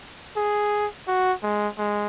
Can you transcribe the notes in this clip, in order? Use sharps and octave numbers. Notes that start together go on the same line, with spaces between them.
G#4
F#4
G#3
G#3